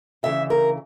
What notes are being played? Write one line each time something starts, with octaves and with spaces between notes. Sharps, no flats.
D2 C#3 E3 E5
A#4